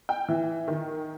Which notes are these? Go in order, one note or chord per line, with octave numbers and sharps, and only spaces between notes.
G5
E3
D#3